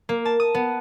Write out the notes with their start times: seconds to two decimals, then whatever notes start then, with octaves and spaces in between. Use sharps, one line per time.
0.09 A#3
0.25 A5
0.40 D#6
0.55 B3